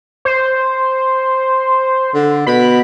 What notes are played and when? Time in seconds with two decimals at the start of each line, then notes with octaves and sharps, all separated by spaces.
0.25 C5
2.14 D3
2.47 B2 B5